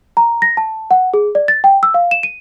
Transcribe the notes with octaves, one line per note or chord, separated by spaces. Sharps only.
A#5
A#6
A5
F#5
G#4
D5
A6
G5
E6
F5
E7
D#7